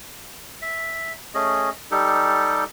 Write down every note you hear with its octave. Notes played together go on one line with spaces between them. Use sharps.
E5
A3 C#4 G#4 D#5
G3 D#4 G4 A4